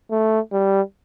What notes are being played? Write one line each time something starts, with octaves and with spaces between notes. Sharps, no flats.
A3
G3